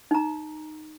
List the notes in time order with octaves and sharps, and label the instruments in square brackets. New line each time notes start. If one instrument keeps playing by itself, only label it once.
[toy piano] D#4 A#5